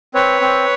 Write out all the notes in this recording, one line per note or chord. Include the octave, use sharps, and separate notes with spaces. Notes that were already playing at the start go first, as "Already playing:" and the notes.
C4 B4 C#5
C4